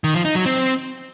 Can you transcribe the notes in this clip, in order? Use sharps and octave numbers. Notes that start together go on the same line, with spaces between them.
D#3
F3
D#4
F#3
C4